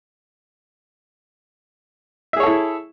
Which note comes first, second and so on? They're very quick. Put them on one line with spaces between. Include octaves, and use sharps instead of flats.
E5 G#4 C#5 A4 E4